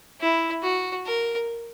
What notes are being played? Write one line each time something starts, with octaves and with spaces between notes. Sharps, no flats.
E4
F#4
A#4